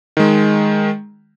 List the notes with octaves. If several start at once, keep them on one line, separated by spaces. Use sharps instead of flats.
D#3 G#3